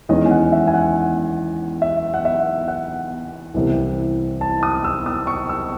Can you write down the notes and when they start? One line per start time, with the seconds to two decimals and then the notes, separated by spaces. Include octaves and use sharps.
0.09 E2 D#3 G#3 C#4 D#5
0.26 G#5
0.31 F#5
0.52 E5
0.67 G#5
0.74 F#5
1.82 E5
2.14 F#5
2.25 E5
2.68 F#5
3.54 C2 C3 E3
4.41 A5
4.63 D#6
4.85 E6
5.06 D#6
5.27 C#6
5.49 E6